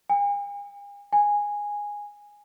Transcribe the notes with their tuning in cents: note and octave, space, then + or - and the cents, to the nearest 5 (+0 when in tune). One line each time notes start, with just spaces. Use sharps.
G#5 -45
G#5 -10